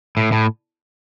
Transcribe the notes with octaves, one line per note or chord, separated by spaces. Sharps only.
A2
A2